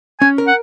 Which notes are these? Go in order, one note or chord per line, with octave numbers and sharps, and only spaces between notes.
C#4 G#5
A#4
F#5